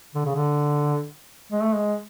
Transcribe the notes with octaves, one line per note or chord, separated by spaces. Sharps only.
D3
C#3
D3
G#3
A3
G#3